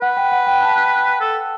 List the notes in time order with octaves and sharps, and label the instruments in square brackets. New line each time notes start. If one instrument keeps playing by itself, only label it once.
[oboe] B4 [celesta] F#5
[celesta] G5
F#5
G5
A5
[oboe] A4